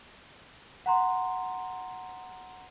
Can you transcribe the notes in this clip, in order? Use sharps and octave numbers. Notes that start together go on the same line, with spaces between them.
F#5 A#5 C6